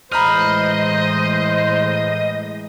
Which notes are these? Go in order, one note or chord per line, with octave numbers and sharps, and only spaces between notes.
A2 E3 G#3 C5 D#5 A#5 B5 F6